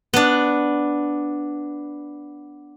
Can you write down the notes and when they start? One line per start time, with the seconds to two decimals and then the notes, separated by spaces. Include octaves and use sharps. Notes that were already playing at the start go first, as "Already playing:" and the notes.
0.13 B3 D4